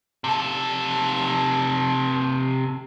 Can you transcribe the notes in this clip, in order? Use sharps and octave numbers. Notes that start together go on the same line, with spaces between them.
C3 A4